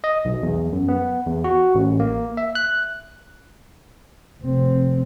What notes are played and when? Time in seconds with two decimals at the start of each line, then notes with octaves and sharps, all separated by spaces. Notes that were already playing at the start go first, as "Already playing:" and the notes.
0.04 D#5
0.25 B1
0.43 E2
0.72 F#2
0.88 B3
1.26 E2
1.44 F#4
1.75 A1
2.00 A#3
2.37 E5
2.55 F#6
4.42 F1 C4